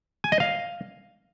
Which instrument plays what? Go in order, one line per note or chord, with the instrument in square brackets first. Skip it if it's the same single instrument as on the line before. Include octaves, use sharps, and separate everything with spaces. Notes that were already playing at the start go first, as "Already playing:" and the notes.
[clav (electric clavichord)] G#5
D#5
F5